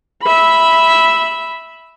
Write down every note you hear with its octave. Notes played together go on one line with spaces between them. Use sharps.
E5 B5